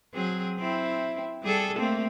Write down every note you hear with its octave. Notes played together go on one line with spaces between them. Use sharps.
F#3 C4 G#4
C4 E4
G3 G#4 A4
A3 A#3 C4